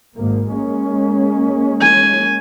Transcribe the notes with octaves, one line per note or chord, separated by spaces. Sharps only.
G#1 G#2 A#3
G#3 A#3 C#4
G#5